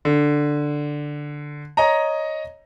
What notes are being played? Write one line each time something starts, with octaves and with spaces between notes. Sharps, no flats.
D3
C#5 D#5 A#5